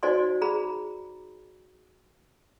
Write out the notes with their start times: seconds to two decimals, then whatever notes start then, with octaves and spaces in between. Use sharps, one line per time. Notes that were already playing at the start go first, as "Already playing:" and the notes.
0.03 D#4 F#4 C5 D5 G#5 C6
0.41 G#4 A#5 B5